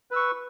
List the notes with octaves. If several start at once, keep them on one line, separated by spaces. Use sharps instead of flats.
B4 C#6 E6